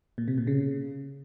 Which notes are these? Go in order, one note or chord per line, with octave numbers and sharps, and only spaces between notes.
A#2
C3
A#2
C#3